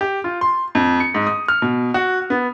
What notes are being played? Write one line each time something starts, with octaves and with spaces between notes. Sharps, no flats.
G4
F4
C6
F2
C#7
G#2
D#6
F6
B2
F#4
B3